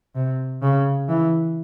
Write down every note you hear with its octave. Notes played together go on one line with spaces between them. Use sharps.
C3
C#3
E3